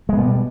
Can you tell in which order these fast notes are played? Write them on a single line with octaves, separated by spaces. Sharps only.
G#3 B3 B2 G3